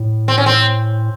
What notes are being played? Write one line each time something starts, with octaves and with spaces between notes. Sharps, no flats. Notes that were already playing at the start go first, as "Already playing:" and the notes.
Already playing: A2
C4
C#4
C4